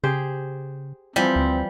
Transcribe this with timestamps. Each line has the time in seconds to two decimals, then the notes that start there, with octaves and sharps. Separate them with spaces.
0.04 C#3 G4 G#4 C5
1.16 E3 F3 G3 C4
1.36 D2